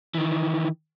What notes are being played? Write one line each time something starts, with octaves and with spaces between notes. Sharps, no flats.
D#3 E3